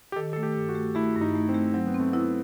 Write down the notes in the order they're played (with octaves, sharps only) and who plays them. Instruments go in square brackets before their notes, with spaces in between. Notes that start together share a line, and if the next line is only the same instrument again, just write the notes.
[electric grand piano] G4
[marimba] D#3 [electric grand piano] A4
[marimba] A3 [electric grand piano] A4
[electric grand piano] G4
[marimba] G2
[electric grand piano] F#4
[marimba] A3
[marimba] A3 [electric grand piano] E4
[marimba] G2
[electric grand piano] D#4
[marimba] A3
[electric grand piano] C4
[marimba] A3
[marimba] F#3 [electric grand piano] C4
[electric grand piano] B3
[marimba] C4
[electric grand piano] A3
[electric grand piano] B3 [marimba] E4